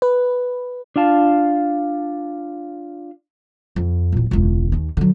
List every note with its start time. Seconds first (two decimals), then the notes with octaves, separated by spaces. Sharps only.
0.02 B4
0.96 D4 F4 F5 A5
3.76 F2
4.12 E1 A#1
4.31 E1 C#2
4.72 D#2 D#3
4.97 D3 F#3